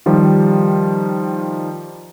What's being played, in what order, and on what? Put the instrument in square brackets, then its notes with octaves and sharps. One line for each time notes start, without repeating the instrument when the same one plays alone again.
[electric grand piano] D#3 F3 G3